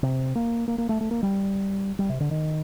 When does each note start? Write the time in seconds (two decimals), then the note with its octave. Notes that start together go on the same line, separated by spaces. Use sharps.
0.03 C3
0.35 A#3
0.68 A#3
0.78 A#3
0.89 A3
1.01 A3
1.11 A#3
1.23 G3
1.99 G3
2.09 C3
2.20 D3
2.31 D#3